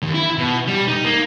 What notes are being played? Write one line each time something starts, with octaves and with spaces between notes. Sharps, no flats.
D#2
E4
B2
G3
D#4
A#3